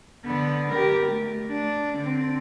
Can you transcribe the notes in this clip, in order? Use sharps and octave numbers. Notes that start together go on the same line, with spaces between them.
D3 B3
G4 A#4
A3
D4
D3 C4